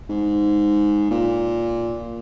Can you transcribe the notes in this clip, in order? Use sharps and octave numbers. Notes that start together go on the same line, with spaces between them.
G#2
A#2